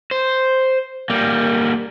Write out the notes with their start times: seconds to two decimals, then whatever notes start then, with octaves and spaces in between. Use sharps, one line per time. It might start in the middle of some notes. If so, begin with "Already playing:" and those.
0.11 C5
1.10 G3 A#3